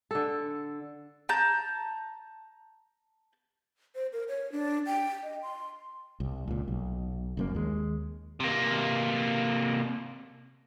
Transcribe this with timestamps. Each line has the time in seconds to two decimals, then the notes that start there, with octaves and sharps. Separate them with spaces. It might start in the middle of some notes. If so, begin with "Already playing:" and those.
0.11 D3 A4
1.29 A5 A#5 G6
3.95 C5
4.13 A#4
4.28 C#5
4.52 D4
4.86 G5
5.23 D#5
5.43 C6
6.20 C2
6.48 C#2 A#2
6.68 B1
7.37 F#1 F#2 A#3
7.55 D#2 G#3
8.40 C3 A#3